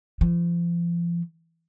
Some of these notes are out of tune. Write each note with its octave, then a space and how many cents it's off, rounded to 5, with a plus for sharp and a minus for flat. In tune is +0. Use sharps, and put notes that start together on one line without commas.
F3 -35